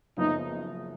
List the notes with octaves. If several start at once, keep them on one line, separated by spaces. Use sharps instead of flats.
F#1 F#2 C#3 F3 B3 D#4